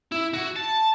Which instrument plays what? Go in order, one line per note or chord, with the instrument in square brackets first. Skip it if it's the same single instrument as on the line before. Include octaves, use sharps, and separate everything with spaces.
[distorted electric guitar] E4
F#4
A5